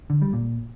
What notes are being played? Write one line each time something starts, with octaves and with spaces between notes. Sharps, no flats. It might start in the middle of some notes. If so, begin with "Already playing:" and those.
D3
G3
A#2